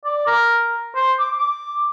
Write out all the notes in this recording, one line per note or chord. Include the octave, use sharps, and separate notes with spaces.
D5
A#4
C5
D6
D6